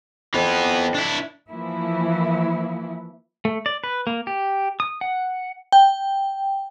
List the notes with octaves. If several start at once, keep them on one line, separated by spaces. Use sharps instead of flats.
F2 E3 B3
D4 E4
E3 F3 A#3 E4
A3
D5
B4
A#3
G4
D#6
F#5
G5